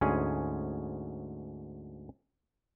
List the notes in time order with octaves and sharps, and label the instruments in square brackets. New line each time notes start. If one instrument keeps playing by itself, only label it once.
[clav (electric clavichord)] D2 G#2 C#4 G#4